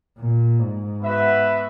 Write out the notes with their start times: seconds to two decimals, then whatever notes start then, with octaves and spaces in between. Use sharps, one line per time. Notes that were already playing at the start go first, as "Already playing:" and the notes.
0.19 A#2
0.60 G#2
1.02 B3 F#4 B4 E5